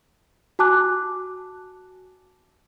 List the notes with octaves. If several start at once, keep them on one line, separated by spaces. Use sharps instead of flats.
F#4 G#5 A5 D6 F#6